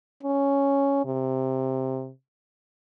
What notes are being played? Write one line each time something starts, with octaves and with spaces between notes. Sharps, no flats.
C#4
C3